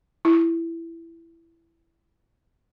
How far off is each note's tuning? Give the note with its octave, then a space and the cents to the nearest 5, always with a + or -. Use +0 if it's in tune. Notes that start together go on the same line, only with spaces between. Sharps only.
E4 +15